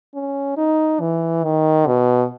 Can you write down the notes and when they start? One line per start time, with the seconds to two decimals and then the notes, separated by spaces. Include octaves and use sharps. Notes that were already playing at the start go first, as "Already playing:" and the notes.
0.14 C#4
0.57 D#4
1.00 E3
1.44 D#3
1.87 B2